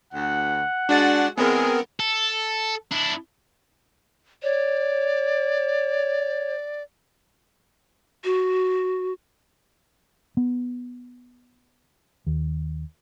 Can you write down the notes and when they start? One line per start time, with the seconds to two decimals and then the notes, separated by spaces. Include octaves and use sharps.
0.13 D2 F#5
0.89 G#3 D4 F#4 D5 A6
1.38 E3 G#3 B3 C4 G#4 A#4
2.00 A4
2.92 D4 E4
4.43 C#5 D5
8.24 F#4
10.37 B3
12.27 D#2